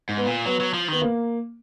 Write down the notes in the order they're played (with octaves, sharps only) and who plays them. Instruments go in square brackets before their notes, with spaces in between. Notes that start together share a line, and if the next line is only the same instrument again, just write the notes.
[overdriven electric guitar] G#2
[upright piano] B3
[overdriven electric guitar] A#2
[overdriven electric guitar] F#3 [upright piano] B3
[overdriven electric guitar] F#3
F3
[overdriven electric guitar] D#3 [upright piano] B3
[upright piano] A#3